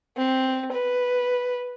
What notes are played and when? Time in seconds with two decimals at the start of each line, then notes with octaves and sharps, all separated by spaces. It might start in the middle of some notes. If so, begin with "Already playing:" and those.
0.18 C4
0.72 B4